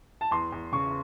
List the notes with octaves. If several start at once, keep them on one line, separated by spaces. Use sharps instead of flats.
A5
E2 C6
E2
C#3 C#6